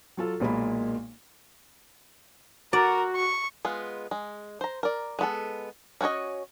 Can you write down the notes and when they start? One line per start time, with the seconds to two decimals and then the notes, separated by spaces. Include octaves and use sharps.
0.17 F#3 F4 A4
0.40 B1 A#2 G#3 A#3 B5
2.73 F#4 A#4 D5
3.16 C#6
3.65 G#3 B3 F4
4.11 G#3
4.61 C5 A#5
4.83 A#4 D5
5.19 G#3 B3 A4
6.01 C#4 F#4 G#4 C#5 D#5